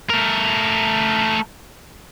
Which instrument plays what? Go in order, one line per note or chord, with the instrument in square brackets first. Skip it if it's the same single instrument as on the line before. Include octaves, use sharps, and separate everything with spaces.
[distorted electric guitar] A3 A#4